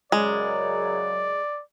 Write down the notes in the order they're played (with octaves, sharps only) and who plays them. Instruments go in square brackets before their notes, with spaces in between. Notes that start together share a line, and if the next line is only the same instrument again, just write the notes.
[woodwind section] F#2 C#3 F#3 [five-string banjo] G#3 [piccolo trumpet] D5